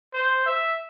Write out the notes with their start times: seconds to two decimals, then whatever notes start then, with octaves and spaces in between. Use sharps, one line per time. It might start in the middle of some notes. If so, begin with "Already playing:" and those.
0.13 C5
0.46 E5